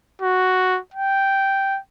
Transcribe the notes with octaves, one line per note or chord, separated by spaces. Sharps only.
F#4
G5